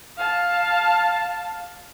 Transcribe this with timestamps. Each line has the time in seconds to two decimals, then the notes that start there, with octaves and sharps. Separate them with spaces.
0.17 F5 A5